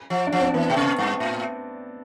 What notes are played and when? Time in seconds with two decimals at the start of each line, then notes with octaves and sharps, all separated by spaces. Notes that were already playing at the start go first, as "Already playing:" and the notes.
0.10 F3
0.27 D4
0.32 F3
0.41 C4
0.54 E3 B3
0.70 B2
0.76 C3
0.98 G2
1.20 A2